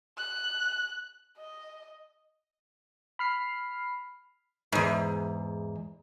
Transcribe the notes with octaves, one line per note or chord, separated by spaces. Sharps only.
F#6
D#5
B5 F6 C7
E2 G#2